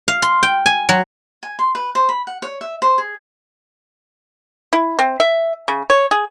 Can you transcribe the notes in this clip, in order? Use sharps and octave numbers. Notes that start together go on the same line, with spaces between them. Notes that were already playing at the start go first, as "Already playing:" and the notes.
F5
C6
G5
G#5
F#3
G#5
C6
B4
C5
B5
F#5
C#5
E5
C5
G#4
E4
C4
E5
C#3
C#5
G#4